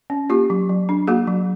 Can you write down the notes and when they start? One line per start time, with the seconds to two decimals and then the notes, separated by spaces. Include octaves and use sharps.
0.10 C#4
0.30 A#3 F4 G4
0.50 F#3
0.69 F#3
0.89 D4
1.08 A#3 F#4 G#4
1.27 F#3